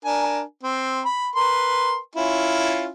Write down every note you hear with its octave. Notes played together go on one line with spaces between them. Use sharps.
D4 A#4 G#5
C4
B5
A#4 B4 C6
C#4 E4 F4